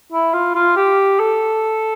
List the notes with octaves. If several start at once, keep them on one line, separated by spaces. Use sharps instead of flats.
E4
F4
F4
G4
A4